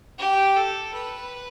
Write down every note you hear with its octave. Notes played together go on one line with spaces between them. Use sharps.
G4
A4
B4